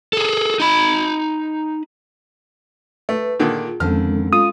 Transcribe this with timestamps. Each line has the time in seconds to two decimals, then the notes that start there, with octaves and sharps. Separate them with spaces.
0.13 G#4 A4
0.60 D#4 B5
3.09 A3 B4
3.40 A#2 D3 D#3 F4 G#4
3.80 F2 D3 D#3 G#3 C#4 A4 F6
4.33 F4 D#6